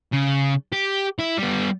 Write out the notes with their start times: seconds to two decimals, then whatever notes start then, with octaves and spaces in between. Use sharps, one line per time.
0.13 C#3
0.72 G4
1.19 E4
1.38 G3 B3